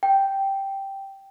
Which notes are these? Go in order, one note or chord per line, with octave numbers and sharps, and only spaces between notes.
G5